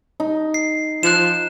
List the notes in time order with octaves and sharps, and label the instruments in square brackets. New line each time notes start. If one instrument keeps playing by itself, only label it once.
[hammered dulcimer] D#4
[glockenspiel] C7
[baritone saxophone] F3 [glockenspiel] F#6 E7